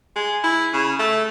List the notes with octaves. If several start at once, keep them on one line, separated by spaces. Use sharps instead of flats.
G#3
E4
C#3
A3